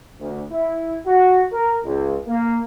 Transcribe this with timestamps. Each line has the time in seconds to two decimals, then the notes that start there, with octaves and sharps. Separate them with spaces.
0.19 D2
0.52 E4
1.06 F#4
1.52 A#4
1.84 C#2
2.27 A#3